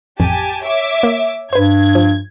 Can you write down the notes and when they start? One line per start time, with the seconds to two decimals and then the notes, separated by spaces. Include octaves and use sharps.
0.20 A1 F2 G4 G#5 A5
0.64 C#5 E5 D6
1.03 A#3
1.53 G2 B4 C5 G#6
1.95 F3